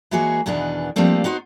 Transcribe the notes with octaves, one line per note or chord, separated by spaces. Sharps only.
E3 G#3 A#3 F#4 G#4 C#5
E2 B2 D#3 E3 B3 D4
F3 G3 A3 A#3 C4 D4
B3 D#4 F#4 C5